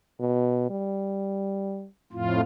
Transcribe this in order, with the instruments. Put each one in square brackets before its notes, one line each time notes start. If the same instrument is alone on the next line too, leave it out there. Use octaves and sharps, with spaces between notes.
[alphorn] B2
G3
[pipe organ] F2 A2 F4